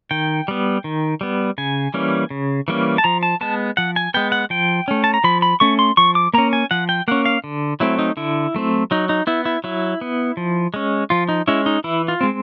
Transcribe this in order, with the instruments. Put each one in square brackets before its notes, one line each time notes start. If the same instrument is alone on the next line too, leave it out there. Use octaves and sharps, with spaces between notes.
[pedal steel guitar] D#3 G5
G3 B3
D#3
G3 B3
C#3 G#5
E3 G3 A#3 C#4
C#3
E3 G3 A#3 C#4
A5
F3 A#5
A5
G#3 B3 A5
F3 F#5
G#5
G#3 B3 G5
F#5
F3 G5
A3 C#4
A5
A#5
F3 B5
B5
A3 C#4 C#6
C6
F3 C#6
D6
A#3 C#4 A#5
G#5
F3 F#5
G5
A#3 C#4 F#5
F5
D3
F#3 A3 C4 E4
D#4
D3 E4
F#3 A3 C4
F#3 D#4
D#4
B3 E4
E4
F#3 E4
B3
F3
G#3 C#4
F3 F4
D#4
G#3 C#4 E4
D#4
E3 E4
F4
G#3 C4